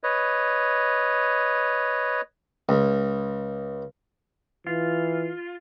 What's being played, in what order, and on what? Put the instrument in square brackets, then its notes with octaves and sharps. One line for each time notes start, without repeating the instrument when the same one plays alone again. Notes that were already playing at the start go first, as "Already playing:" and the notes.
[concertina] B4 C#5 D#5
[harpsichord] C#2
[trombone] E3 [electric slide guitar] F4